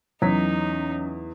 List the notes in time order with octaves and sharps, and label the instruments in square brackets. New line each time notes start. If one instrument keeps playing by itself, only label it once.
[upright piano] E2 B6 [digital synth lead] F#3 [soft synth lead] C#4 [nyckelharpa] D#4